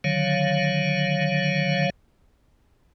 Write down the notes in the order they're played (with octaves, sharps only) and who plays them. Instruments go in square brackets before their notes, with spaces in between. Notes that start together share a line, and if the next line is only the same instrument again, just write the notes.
[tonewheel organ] D3 D#3 F#3 C#5 F5